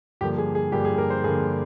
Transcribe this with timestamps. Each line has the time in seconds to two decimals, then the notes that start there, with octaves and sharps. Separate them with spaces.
0.21 G2 D3 F3 A#3 G4
0.38 G#4
0.55 G#4
0.72 G2 D3 F3 A#3 G4
0.85 G#4
0.98 A#4
1.10 C5
1.23 G2 D3 F3 A#3 G#4